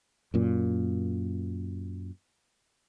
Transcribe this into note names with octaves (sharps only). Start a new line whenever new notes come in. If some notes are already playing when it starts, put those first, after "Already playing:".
F#2 A#2